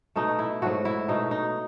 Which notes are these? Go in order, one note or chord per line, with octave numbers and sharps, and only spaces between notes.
B2 A3 D#4
E4
G#2 F#3 A3 F#4
E4
B2 A3 D#4
D#4